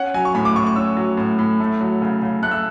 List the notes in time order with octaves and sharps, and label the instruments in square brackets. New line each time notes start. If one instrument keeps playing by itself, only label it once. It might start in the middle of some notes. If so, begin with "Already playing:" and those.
Already playing: [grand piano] C#4 F#5
F#3 G#5
C#6
A2 B5
D6
A2 C#6
C#6
C#4 E6
F#3
A2
A2
A3
F#3
C#3
C#3
A3 F#6
E6